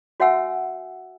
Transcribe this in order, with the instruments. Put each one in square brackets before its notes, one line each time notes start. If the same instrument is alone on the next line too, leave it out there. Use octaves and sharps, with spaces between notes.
[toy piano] F#4 C#5 E5 F#5 G#5 E6